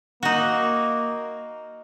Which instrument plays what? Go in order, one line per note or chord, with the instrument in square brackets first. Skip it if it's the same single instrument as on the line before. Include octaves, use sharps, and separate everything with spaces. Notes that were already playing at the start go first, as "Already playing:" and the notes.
[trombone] A#3 [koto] D#4 F#4